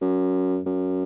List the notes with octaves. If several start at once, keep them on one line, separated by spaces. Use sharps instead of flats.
F#2
F#2